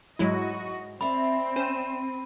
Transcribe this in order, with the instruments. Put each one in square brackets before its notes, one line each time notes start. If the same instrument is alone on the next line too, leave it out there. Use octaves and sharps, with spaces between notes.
[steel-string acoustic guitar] G#2 [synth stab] F#3 G#3 E4 [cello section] F#4 D#5
[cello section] C4 [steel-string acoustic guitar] D5 E5 [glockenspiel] B5
[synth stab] C#4 C5 E7 [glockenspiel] D#7